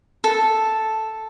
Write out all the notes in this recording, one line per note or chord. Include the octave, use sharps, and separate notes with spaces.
A4